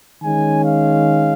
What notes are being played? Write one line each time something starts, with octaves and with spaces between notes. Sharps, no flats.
D#3 G#3 C#4 G#5
F5